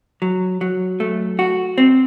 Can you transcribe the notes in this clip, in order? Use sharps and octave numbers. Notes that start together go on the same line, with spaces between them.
F#3
F#3
A3
F#4
C4